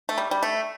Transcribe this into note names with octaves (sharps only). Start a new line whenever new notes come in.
A3
G3
G3
A3